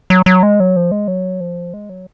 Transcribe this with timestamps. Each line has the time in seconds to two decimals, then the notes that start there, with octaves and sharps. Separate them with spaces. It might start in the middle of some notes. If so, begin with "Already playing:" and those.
0.10 F#3
0.26 F#3
0.43 G#3
0.60 F#3
0.76 F3
0.91 G#3
1.08 F#3
1.40 F3
1.74 G#3
1.89 F#3